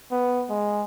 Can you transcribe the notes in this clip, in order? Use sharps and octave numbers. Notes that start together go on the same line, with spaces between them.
B3
G#3